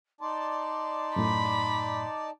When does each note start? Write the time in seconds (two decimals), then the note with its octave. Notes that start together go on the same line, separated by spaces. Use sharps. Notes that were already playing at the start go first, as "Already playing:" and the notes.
0.21 D#4 D5 A5 C6
1.16 F#2 A2 B5